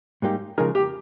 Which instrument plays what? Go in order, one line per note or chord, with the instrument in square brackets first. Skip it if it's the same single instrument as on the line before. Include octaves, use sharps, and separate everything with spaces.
[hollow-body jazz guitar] G#2 G3 A#3 D#4 G4
[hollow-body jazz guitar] C#3 F3 G#3 D#4 G#4 [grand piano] A#4
[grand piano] G4